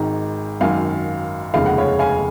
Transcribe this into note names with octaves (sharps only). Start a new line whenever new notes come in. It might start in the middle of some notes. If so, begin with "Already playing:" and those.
Already playing: G#1 G#2 D#3 A#5
G#1 F#2 D#3 F5 G#5
F1 D#2 C#3 F3 G#3 F5
F#5
C#5 F5
F5 G#5